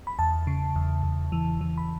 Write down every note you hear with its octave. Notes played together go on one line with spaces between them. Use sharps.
B5
E2 A5
C#3
E2
E2
E3
E3
B5